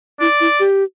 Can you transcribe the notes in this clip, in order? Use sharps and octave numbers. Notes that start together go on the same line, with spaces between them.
E4 D5
E4
G4